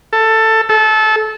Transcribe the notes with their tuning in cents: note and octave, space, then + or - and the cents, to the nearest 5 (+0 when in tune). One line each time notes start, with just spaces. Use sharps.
A4 +15
A4 -20